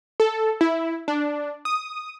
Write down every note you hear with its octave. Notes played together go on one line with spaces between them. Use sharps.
A4
E4
D4
D#6